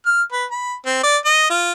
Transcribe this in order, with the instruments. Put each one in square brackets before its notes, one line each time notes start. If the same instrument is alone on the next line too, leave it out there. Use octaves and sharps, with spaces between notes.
[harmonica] F6
B4
B5
C4
D5
D#5
F4